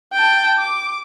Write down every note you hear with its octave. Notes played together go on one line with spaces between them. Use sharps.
G5 A5
D6